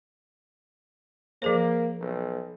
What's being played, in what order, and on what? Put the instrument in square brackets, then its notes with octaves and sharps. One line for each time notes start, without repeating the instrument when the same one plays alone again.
[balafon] F3 G#4 C5 [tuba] A#3
[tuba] B1